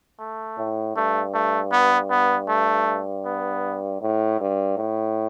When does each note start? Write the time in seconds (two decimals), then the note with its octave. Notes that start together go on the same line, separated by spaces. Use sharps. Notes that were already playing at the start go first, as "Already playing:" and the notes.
0.19 A3
0.58 A2
0.96 G2 A3
1.34 A3
1.72 B3
2.10 B3
2.48 A3
3.25 B3
4.02 A2
4.40 G2
4.78 A2